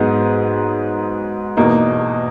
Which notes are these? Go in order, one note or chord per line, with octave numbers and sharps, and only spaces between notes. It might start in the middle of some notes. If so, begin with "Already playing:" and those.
Already playing: G#2 F#3 B3 D#4 G#4
E2 B2 A#3 D#4